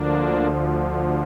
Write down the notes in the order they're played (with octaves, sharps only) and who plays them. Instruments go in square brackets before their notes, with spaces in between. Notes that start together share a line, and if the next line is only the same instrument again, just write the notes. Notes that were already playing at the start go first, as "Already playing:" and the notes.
Already playing: [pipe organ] D2 D3 F3 A#3 D4